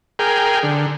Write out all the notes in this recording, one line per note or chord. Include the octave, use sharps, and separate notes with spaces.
G#4 A#4 G5
D3